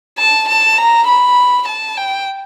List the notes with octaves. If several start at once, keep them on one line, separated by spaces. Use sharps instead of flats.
A5
A5
A#5
B5
A5
G5